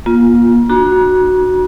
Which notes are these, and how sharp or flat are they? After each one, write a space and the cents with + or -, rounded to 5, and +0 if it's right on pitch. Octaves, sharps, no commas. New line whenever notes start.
A#3 +35 F4 +0
D4 +30 F#4 +0 A#5 +40